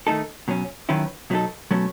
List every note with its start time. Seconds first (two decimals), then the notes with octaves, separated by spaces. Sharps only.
0.07 D#3 A3 D#4 A4
0.48 B2 F#3 C#4
0.89 D#3 F#3 C#4 E4 B4
1.30 B2 F#3 B3 D#4 A4
1.71 B2 F#3 A3 C#4